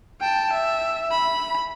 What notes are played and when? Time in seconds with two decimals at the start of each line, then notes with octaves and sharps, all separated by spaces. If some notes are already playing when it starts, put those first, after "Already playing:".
0.21 G5 A5
0.53 E5
1.12 B5